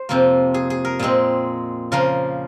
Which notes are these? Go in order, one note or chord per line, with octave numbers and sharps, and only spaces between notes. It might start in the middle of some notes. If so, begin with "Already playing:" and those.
Already playing: C5
F2 C3 F3 A#3
G#4
G#4
A#4
A#2 G#3 C4
C#3 F3 A#3 A#4